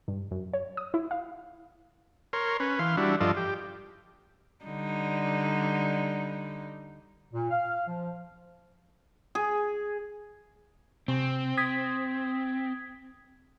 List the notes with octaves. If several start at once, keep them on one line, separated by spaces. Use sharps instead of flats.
G2
F#2
C#5
D#6
E4
F5
A#4 C#5 C6
C#4 B4
E3 F5 C6
G3 D4 E4 F#4
G2 F3 F4 A4 D5 D#5
G4
D3 G3 D#4
A#2
F5
F3
G#4
C3 C4
D#6 G#6 B6